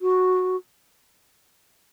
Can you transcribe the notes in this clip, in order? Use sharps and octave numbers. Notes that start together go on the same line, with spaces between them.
F#4